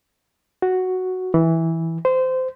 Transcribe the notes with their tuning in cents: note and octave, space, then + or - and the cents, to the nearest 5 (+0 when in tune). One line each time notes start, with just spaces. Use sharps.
F#4 +0
E3 -10
C5 -20